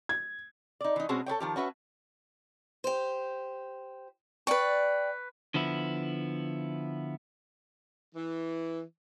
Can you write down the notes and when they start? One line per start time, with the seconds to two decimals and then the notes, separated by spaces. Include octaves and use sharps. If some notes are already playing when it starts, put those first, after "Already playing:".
0.09 G#6
0.81 D#4 D5
0.96 E3 D#4
1.09 B2 G#3 C4 C#4 F#4 G#4
1.26 A4 B4 C#5 G5
1.40 D#3 F3 G4
1.56 C#4 F#4 B4 E5
2.84 G4 C5
4.47 B4 D5 G5 C#6
5.54 D3 F3 B3 E4
8.15 E3